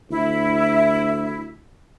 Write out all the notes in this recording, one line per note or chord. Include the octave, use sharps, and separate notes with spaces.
D2 E4